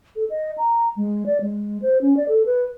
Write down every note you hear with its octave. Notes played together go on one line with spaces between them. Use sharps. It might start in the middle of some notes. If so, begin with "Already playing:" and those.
A4
D#5
A#5
G#3
D5
G#3
C5
C#4
D5
A4
B4